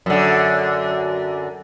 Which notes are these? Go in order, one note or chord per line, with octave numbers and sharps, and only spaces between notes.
F#2 D3